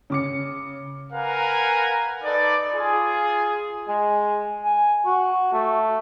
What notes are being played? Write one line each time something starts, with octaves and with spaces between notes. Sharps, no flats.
C#3 D6 C#7
A#4 B4 F5 F#5 G#5 A#5
D#4 A4 B4 D5
F4 G#4 G#5
G#3
G#5
F#4
A3